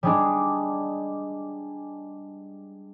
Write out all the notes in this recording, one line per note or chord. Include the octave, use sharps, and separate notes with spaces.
G3 G#3 D4